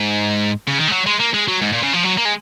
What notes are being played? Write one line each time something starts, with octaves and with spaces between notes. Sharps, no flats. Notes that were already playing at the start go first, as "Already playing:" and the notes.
Already playing: G#2
C#3
D#3
G#3
F#3
G#3
A#3
G#3
F#3
G#2
A#2
C#3
F3
F#3
A#3
G#3